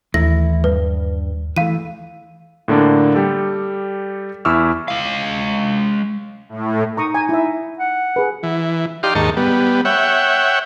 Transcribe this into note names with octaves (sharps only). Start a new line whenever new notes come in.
D#2 E3 A3 E4 A#6
G2 B4
E3 A3 F5 D#7
A2 D3 A#3 D4
G3 G4 A4
E2 E4 C#6 D6 E6 F6
G#3 F5
A2
D#4 A#5 C#6 D#6
G#5
E4 E5
F#5
G#4 B4
E3
D#4 G4 D5 F5 C6
D#2 G#2 D#4 A5 C#6
G3 B3
C#5 E5 F#5 G5